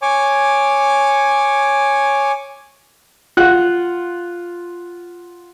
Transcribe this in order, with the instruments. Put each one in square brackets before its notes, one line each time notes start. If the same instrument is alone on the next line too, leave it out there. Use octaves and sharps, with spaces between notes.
[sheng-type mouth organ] C#5 G#5 D6
[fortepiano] F4 F#5 F#6